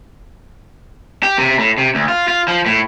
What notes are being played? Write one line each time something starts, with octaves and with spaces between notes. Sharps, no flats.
G4
C3
A2
C3
D2
F4
F4
F3
A2